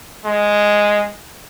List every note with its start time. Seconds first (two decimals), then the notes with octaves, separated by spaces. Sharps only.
0.24 G#3